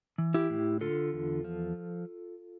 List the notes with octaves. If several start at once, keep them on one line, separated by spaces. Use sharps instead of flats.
E3
E4 G4
A2
D3 F4 A4
E2
F3